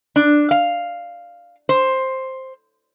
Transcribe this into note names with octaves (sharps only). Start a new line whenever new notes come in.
D4
F5
C5